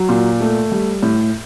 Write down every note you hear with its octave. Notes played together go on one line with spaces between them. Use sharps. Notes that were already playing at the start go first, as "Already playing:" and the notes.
Already playing: F#3
A#2
A3
G3
A2